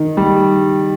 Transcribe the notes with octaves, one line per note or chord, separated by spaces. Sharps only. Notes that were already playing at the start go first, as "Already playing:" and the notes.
Already playing: D#3
G3